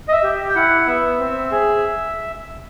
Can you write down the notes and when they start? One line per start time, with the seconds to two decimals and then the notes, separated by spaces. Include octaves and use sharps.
0.08 D#5
0.12 E5
0.23 G4
0.50 G5
0.55 E4 F#5
0.87 B3 E5
1.19 C4
1.51 G#4